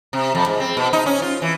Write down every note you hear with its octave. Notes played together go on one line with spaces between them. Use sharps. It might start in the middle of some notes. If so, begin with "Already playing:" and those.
C3
F2
G#2
C4
B2
D#4
C#4
F4
E3